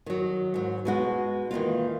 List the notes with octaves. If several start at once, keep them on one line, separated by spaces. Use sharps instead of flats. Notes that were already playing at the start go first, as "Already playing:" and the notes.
D#3 F#3
G#2 F#3
B2 G#3 F#4
D#3 E3 A#3 F4